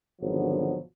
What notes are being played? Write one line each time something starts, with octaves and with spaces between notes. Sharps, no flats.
G#1 B2 D3 F3 F#3